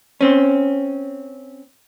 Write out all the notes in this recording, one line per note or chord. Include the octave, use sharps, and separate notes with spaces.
C4 C#4